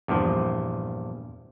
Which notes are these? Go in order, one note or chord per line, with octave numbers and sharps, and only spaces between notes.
E2 G2 A#2 F3